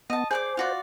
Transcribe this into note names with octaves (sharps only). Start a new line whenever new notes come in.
B3 D#5 A5
G#4 C5 D5 D6
F4 F#4 D5